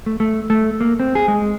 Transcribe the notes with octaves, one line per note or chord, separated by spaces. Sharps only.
A3
A3
A3
A#3
C4
G#4
G#3